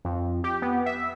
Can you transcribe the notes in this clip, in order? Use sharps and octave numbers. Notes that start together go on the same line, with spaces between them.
F2
G4
B3
E5